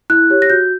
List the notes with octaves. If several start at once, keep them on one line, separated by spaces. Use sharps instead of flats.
E4 F#6
G4 C#5
A#6
F#4 G6